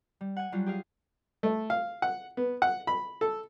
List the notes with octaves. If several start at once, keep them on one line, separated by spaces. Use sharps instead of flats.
G3
F#5 G#5
F#3 G3 F4
G4 G#4 F5
A3
F5
F#5
B3
F#5
B5
A4